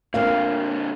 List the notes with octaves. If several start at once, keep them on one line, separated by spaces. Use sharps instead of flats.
A#2 D3 A3 A#3 C4 F5